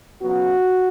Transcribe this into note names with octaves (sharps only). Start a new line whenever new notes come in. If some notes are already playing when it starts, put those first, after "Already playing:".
C#3 F#3 B3 F#4